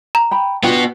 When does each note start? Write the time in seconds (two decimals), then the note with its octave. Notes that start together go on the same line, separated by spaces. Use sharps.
0.15 A#5
0.31 G5 B5
0.63 B3 D4 F4 F#4 G5